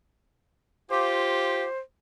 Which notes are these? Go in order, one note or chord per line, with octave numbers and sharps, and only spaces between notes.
F4 G4 C5